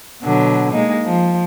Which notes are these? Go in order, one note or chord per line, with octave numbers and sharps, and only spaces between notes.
B2 D3 F#3
G#3 A#3 D#4
F3